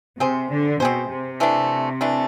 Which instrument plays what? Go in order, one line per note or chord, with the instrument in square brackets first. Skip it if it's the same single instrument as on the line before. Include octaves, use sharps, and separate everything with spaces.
[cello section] C3 [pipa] C4 G#4 C5
[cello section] D3
[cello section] B2 [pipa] C4 G#4 C5
[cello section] C3
[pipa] E3 A3 D4
E3 A3 D4